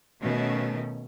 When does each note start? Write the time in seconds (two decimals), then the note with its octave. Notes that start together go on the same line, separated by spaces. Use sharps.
0.21 B2 D#3 A3 C#4